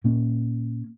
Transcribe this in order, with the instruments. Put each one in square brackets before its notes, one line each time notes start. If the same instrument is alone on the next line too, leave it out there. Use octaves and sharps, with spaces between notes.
[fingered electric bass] A#2 A#3 C#4